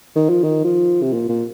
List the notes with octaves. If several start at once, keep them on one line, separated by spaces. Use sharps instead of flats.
D#3
F3
D#3
F3
C3
A#2
A#2